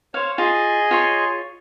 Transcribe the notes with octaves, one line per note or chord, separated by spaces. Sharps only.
C5 C#5 F5
F4 G#4 D#5 G#5
F4 C#5 C6